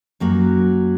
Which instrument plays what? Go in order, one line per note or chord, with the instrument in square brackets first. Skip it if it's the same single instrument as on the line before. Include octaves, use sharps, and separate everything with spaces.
[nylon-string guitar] F#2 F#3 A#3 F#4